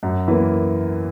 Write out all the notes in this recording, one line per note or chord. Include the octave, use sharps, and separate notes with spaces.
F#2
E3 A#3